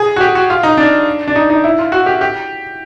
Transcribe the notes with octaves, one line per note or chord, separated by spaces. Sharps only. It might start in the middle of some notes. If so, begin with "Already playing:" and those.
Already playing: G#4
F#4
G4
F#4
F4
D#4
D4
D4
D#4
D#4
E4
F4
F#4
G4
G4